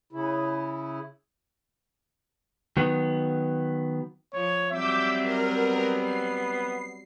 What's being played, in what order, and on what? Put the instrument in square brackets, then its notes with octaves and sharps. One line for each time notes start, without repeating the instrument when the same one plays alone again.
[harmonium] C#3 E4
[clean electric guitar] D#3 F#3 B3
[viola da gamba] F3 [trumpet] C#5
[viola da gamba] F#3 G3 C4 [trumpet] E5 [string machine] D6 E6 G6
[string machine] A#4
[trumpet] B3
[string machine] C7